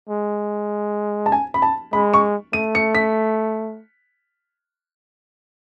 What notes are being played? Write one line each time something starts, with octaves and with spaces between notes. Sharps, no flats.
G#3
A5
G#5
B5
A5
G#3 B5
C#6
A3 D#7
C#7
B6